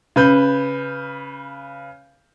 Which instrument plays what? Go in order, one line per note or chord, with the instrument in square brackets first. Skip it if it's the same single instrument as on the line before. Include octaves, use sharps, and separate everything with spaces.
[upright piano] C#3 B4 G6